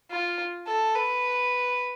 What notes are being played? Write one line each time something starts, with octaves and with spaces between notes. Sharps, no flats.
F4
A4
B4